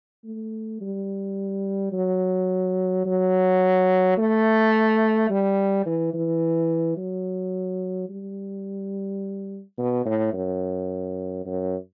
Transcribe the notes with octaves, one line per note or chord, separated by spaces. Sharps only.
A3
G3
F#3
F#3
A3
G3
E3
E3
F#3
G3
B2
A2
F#2
F#2